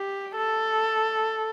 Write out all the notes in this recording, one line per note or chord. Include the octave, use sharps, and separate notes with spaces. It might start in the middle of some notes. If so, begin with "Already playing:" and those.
Already playing: G4
A4